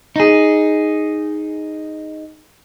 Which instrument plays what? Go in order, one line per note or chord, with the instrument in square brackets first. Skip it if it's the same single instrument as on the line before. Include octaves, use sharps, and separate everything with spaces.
[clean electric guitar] D#4 G#4